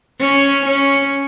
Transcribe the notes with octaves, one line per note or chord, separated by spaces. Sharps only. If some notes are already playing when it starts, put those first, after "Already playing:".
C#4
C#4